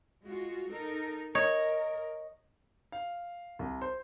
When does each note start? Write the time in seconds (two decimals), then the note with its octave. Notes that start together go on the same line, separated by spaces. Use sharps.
0.23 G#3 F4 F#4
0.69 D#4 A4 A#4
1.35 A#4 C#5 D#5
2.92 F5
3.59 C2
3.82 C5